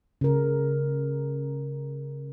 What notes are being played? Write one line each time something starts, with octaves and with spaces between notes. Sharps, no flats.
C#3 A#4